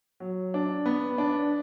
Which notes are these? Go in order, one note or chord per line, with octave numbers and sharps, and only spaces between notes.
F#3
D4
B3
D4